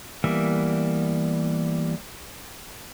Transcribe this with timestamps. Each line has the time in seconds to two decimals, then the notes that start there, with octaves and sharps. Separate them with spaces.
0.24 E3 G3 A#3 B3 E5